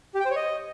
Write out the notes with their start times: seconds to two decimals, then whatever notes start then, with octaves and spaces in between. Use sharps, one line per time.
0.15 G4
0.20 G5
0.25 C5
0.31 C#5
0.36 D#5